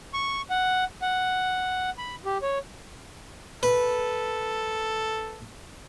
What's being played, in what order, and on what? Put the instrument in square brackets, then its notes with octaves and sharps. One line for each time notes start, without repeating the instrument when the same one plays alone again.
[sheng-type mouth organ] C#6
F#5
F#5
B5
G4
C#5
[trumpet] A4 [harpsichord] B4